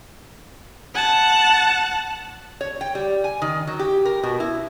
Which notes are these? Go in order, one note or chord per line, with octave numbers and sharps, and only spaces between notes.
F#5 A5
C#5
G5
G3
G#5
D#3
F#3
G4
A#4
B2
E4